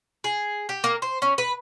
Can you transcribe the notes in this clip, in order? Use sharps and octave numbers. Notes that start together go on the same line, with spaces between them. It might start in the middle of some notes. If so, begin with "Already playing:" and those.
G#4
G4
A#3
C5
C#4
B4